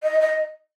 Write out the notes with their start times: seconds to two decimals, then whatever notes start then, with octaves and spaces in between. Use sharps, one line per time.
0.03 D#5
0.20 D#5